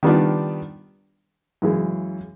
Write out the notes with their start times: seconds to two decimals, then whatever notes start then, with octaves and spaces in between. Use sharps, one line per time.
0.03 D#3 G3 B3 D4 F4
1.62 F#2 C#3 E3 G#3